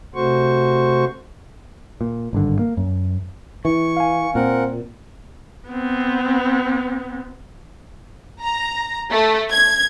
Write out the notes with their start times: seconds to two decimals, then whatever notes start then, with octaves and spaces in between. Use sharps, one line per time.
0.15 C3 A3 F#4 C5 C#6
2.01 A#2
2.33 G#1 G2 D3
2.59 A#3
2.77 F#2
3.65 E3 C#6
3.97 F5 G#5
4.35 A#2 C4 A#4 F#5
5.68 B3 C4
8.42 A#5
9.10 A3
9.52 G#6